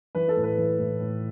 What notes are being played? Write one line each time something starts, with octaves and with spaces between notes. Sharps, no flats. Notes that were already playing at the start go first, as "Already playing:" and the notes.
E3 B4
A4
A2
B4
E3
A2
A2